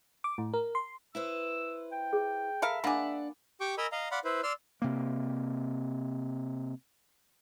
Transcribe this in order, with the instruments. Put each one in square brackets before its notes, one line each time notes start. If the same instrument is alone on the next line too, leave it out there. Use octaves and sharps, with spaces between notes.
[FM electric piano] D6
A2
A#4
C6
[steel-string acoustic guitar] E4 B4 C5 [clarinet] E6
[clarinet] G5
[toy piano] G#4
[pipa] A4 A#4 F5 [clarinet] E5 [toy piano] B5
[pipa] A#3 G#4 [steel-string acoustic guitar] D4 D5 F#5 [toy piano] B5 D6
[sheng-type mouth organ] G4 G5 C#6 D6
A#4 D#5 G#5 A#5 B5 E6
D#5 F5 A#5
D5 F5 F#5 B5 C6
E4 B4 C5
D5 C6 E6 F6
[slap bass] C3 A#3